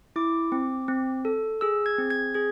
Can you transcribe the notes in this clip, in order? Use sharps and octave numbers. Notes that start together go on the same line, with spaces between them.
E4 D6
C4
C4
A4
G#4 E6
G#6
C4
G#6
G#4 G#6